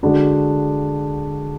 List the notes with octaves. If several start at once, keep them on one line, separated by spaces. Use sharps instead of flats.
D3 G#3 D4 F#4